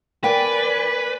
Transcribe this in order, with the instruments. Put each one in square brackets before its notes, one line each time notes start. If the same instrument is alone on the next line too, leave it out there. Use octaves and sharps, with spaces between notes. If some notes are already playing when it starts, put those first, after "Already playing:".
[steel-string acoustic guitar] A#3 [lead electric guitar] B4 [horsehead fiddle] D5 G#5 [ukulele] G5